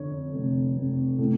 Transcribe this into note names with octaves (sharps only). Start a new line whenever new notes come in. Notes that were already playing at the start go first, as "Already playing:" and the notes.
Already playing: F2 D3 C#5
F1
F1
A2 A4